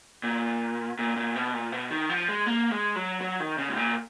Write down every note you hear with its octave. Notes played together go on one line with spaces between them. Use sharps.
A#2
A#2
A#2
B2
A#2
B2
D#3
F3
G#3
A#3
G#3
F#3
F#3
D#3
C#3
G#2
A#2